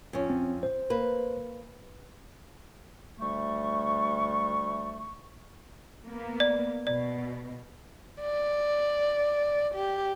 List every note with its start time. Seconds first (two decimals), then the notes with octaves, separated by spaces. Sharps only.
0.13 F2 C#4
0.30 C4
0.63 C5
0.90 A#3 B4
3.20 D2 G3 A3 C#6
6.06 A#3 B3
6.40 D5
6.87 B2 D5
8.21 D5
9.75 G4